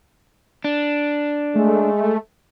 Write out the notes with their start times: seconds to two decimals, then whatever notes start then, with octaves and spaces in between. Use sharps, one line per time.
0.64 D4
1.56 G#3 A3